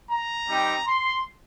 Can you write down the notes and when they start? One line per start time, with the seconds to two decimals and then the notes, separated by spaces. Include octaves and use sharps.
0.10 A#5
0.48 G3 C4 D#4 G4
0.87 C6